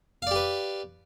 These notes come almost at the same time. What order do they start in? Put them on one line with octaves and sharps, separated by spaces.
F5 D5 G4 B4